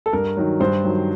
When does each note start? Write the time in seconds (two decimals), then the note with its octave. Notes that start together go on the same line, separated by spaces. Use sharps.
0.06 A4
0.13 G2 A#4
0.37 D#3 F#3
0.60 G2 C5
0.84 D#3 F#3